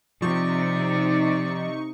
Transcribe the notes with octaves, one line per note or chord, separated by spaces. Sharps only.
C3 F3 D#4 D5 C#6